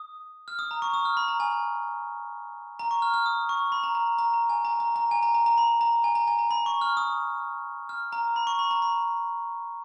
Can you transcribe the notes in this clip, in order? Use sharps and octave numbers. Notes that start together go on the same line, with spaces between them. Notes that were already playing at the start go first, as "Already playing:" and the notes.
Already playing: D#6
F6
D#6
A#5
C#6
D#6
F6
B5
A#5
G#5
A#5
C#6
F6
F6
D#6
C#6
B5
A#5
A#5
A#5
A#5
G#5
A#5
A#5
A#5
G#5
A#5
A#5
A#5
B5
A#5
G#5
A#5
G#5
A#5
B5
C#6
F6
D#6
F6
A#5
B5
C#6
B5
A#5
B5